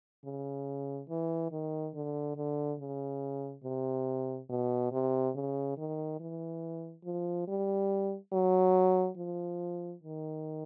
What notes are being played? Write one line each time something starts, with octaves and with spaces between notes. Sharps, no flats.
C#3
E3
D#3
D3
D3
C#3
C3
B2
C3
C#3
D#3
E3
F3
G3
F#3
F3
D#3